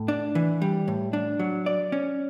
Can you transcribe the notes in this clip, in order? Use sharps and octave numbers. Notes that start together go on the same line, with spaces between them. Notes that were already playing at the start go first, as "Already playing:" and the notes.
Already playing: A2
D4
E3
G3
A2
D4
F#3
D5
C#4